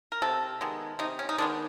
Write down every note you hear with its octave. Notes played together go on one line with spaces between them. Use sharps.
A#4
C3 A4
D#3 G#3 B3
C3 D#4
C#4
D#4
D#3 G#3 B3 D4